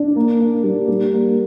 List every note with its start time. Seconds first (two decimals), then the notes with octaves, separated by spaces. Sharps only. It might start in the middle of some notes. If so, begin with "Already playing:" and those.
Already playing: D4
0.16 A#3
0.40 A#3
0.64 G3
0.88 G3
1.12 A#3